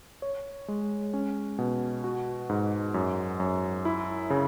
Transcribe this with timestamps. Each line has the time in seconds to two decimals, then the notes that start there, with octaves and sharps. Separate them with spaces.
0.22 C#5
0.68 G#3
1.14 C#4
1.58 B2
2.04 F#4
2.49 G#2
2.94 F#2
3.40 F#2
3.85 E4
4.30 C#3